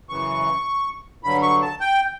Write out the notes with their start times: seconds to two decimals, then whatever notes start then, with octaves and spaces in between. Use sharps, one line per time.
0.09 F#2 C#3 E3 C#6
1.23 G2 D3 F#3 B5
1.42 C#6
1.62 A5
1.80 G5